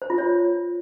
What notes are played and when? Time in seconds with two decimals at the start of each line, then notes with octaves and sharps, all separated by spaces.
0.02 C5
0.10 F4
0.18 C#5